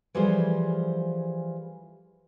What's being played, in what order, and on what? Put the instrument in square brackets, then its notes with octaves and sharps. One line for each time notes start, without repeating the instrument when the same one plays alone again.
[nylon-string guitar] E3 F3 G3 G#4 A4 C5